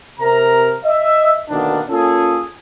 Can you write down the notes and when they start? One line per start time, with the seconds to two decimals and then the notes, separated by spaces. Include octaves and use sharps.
0.20 C3 A#4 A#5
0.84 D#5 E5
1.49 D2 B2 D#3 A#3 B3 D4
1.89 A#3 C#4 F4 G#4 A4